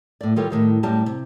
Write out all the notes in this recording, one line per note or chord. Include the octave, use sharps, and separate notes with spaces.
A2 D5
D#3 G3 F4 G4 A4 C#5
A2 D#3 G3
F#2 A2 G3 A5
C3